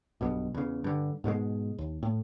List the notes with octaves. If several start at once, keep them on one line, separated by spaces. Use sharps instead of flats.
B1 G2 B2
E2 C#3
G2 D3
G#2 B2 G3 G#3
D#2
A2